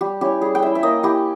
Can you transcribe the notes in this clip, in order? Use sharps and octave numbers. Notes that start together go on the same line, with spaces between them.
G3 G4
C#4 E4 G4
G3 G#4
G5
C#4 E4 E5
E5
A#3 D#5
E4 G4